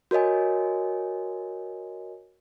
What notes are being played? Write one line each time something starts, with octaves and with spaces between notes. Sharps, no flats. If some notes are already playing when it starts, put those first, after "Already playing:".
F#4 A#4 C#5 D#5 G#5